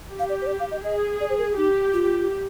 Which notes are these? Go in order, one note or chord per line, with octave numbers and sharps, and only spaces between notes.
G4
F5
D5
C5
D5
F5
D#5
G#4 D#5
D5
C5
A#4
D#4 G4
F4